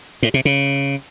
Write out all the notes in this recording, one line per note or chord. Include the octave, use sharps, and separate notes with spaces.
A2
C3
C#3